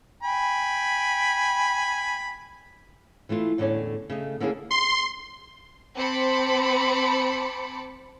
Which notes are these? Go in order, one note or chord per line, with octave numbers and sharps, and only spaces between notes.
G5 G#5 B5
E3 A3 E4 F4
E2 A2 D3 C#4 C#5 D5
C#3 A3 D#5
D3 A#3 C#4 E4 G4 G#4
C6
C4 C5 A5 B5 D6 C#7